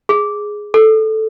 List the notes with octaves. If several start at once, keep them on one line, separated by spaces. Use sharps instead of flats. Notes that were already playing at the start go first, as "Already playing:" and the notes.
G#4
A4